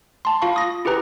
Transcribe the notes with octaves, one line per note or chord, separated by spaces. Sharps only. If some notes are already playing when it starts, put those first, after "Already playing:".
A5 C6
F4 F5 B5 C#6
D#6 A#6
E4 G4 G#4 B4 A#5